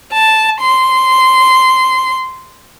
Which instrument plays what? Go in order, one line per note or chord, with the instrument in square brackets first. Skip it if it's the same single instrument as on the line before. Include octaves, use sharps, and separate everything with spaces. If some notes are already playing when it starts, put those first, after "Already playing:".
[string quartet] A5
C6